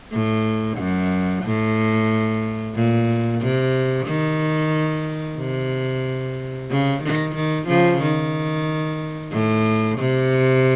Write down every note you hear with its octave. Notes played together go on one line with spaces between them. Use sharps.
A2
F#2
A2
A#2
C3
D#3
C3
C#3
D#3
D#3
C#3 F3
D#3
A2
C3